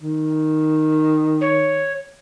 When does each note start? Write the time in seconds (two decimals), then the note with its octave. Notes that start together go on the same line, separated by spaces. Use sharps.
0.02 D#3
1.41 C#5